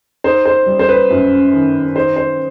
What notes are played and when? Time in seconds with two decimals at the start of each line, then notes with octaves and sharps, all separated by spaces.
0.24 D#4 C5
0.46 C5
0.66 G3
0.79 C5
0.89 B4
1.10 F#2
1.53 D#3
1.95 D#4 C5
2.16 C5